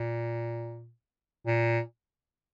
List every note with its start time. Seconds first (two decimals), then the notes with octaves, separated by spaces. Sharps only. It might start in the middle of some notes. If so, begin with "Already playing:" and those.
Already playing: A#2
1.47 A#2